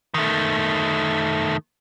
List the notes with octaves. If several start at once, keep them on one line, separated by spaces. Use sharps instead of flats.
D#3 A3